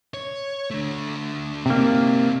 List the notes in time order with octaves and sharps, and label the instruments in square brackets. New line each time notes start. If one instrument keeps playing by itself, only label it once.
[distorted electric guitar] C#5
D3 A3
[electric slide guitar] C3 A#3 [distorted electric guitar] C4 D#4